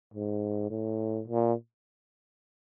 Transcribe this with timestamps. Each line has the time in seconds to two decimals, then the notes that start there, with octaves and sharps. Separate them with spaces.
0.14 G#2
0.70 A2
1.28 A#2